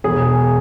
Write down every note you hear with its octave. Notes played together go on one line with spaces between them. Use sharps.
E1 G#4